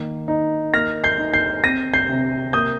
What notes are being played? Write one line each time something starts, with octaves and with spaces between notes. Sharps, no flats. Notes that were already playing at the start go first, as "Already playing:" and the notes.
Already playing: D#3 A#3
D#4
A#3 F6 A#6
G6 C7
D#4
G6 C7
C4 A#6 D#7
G6 C7
C3
A#3 D#6 G6